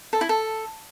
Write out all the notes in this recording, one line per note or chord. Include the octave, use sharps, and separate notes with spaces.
A4
E4
A4